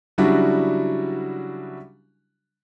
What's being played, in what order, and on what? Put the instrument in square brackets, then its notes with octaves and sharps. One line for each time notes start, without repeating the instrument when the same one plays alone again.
[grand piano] C#3 F#3 G3 D4 E4 F#4